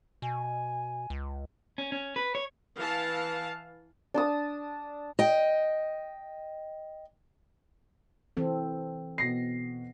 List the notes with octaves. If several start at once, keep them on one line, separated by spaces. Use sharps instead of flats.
B2 G#5
C#2
C#4
C#4
B4
C#5
E3 F5 A5
D4 A5 D#6
D#5 G5
E3 C4 A4
B2 A#6 C7